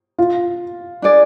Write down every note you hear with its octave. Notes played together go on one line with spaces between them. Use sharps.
F4
D4 G#4 D5